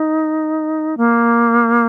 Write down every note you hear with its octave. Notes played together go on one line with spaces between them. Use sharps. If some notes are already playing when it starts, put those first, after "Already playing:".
Already playing: D#4
A#3